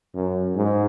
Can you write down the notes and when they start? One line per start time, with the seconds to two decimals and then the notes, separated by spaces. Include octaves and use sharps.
0.14 F#2
0.56 G#2